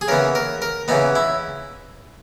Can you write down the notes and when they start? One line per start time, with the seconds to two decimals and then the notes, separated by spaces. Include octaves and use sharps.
0.01 G#4
0.08 C#3 E3 B3 A#4
0.35 A#4
0.62 A#4
0.88 C#3 E3 B3 D#4
1.15 E4